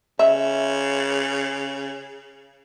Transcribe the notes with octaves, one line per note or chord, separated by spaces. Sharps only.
C#3 E5